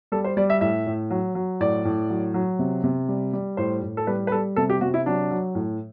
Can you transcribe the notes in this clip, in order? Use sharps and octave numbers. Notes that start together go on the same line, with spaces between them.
G3 A4
C5
G3 D5
E5
A2 E5
A2
F#3
F#3
A2 D5
A2
F#3
F#3
C3
C3
G3
G3
A2 C5
A2
A4
G3 B4
B4
G3 A4
C3 A4
G4
C3 F#4
E4
F#3 D4
F#3
A2